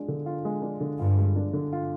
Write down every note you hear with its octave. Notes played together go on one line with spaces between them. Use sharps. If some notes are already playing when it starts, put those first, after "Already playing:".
Already playing: G#3 D4 F4
D3
F4
G#3
D4
D3
G2 F4
G#3
D4
D3
F4